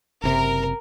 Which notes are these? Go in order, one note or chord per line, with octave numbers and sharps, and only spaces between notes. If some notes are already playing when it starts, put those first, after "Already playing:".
F#1 C3 A#4